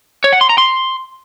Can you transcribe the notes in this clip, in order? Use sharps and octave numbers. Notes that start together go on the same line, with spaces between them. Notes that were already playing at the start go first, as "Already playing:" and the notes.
C#5
F#5
C6
A#5
C6